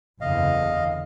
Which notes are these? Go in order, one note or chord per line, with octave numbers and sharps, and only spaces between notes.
F#1 E2 D3 D#5 F5